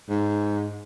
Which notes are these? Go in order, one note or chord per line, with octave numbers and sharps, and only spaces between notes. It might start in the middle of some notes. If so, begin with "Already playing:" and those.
G#2